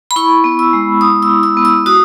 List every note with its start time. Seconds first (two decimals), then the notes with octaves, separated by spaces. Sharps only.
0.11 B5
0.16 E4 C#6
0.44 B3
0.59 E6
0.73 G#3
1.01 G#3 D#6
1.22 E6
1.29 E4
1.43 E6
1.57 B3
1.65 E6
1.86 F#4 D#6